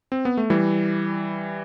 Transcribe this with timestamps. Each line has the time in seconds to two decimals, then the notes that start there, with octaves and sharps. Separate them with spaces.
0.12 C4
0.25 B3
0.37 A3
0.50 E3 G3